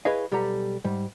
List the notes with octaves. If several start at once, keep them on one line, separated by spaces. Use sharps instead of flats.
E4 G#4 B4 C#5 D#5 F5
B1 G3 G4 A4 F#5 A#5
G#2 G3